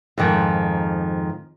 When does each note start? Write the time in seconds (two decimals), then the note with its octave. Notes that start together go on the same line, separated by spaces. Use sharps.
0.18 F2 G#2 D#3 F3